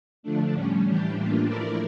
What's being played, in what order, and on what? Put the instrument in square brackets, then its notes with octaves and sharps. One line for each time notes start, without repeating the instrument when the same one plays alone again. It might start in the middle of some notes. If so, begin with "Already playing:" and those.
[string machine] D3 F3 A3 D4
A2 G3 C#4
A2 E3 G3 D4 G4
A2 E3 A#3 D4 F4
F3 A3 E4 A#4 D5